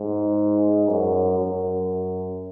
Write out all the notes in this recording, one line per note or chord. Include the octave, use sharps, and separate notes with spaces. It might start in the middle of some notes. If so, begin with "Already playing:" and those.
Already playing: G#2
F#2
F#2